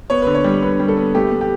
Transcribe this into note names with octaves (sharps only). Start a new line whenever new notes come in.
B3 C#5
D3 B4
C#5
G3
D3 B4
G3
A4
B3
A3 G4
A3
G4